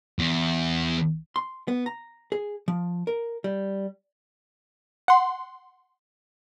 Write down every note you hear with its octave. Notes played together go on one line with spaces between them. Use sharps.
E2
C6
B3
A#5
G#4
F3
A#4
G3
F#5 C6